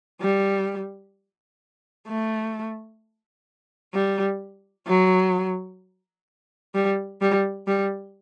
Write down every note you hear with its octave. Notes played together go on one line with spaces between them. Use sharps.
G3
A3
G3
F#3
G3
G3
G3